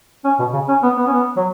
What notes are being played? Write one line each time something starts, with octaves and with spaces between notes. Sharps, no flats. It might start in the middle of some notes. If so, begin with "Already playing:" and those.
C#4
B2
C#3
C#4
B3
B3
C#4
B3
F#3